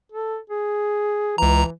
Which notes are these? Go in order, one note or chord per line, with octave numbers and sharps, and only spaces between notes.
A4
G#4
C#2 E3 A#5